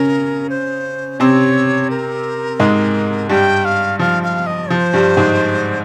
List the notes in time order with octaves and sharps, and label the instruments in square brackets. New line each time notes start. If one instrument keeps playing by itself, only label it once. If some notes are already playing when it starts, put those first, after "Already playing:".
Already playing: [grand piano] C#3 C#4 [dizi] A#4
[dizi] C5
[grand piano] C3 C4 [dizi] C#5 D#5
[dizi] A#4
[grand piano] G#2 G#3
[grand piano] G2 G3 [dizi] G5
[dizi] F5
[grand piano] F3 [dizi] F5
[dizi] F5
D#5
[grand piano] F3 [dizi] C5
[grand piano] G2 G3
G#2 G#3